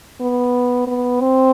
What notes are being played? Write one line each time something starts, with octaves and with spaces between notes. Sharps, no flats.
B3
B3
C4